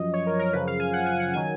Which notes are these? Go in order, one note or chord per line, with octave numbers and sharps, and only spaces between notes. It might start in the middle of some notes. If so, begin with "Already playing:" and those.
Already playing: F#2 F3 D#5
C#5
A#4
A#4
F#2 C#3 F3 B4
F5
G#5
F#5
G#5
F#5
D#3 F#3 G#5